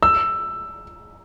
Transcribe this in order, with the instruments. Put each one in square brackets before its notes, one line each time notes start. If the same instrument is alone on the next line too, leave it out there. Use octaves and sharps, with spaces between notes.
[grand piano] E6